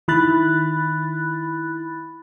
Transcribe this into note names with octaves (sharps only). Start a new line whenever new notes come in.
D#3 E4 B5 F#6 A6